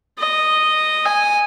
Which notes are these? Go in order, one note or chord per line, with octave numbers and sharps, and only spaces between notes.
D#5
G#5